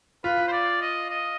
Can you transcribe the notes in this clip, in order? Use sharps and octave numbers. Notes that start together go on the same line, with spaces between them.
F4 B4
C5
D5
D#5
D#5